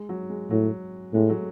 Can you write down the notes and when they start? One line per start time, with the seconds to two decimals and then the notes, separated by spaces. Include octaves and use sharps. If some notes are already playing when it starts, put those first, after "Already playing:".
Already playing: G#3
0.09 F#3
0.29 G#3
0.50 A2 F#3
1.13 A2 G#3
1.29 F#3 A3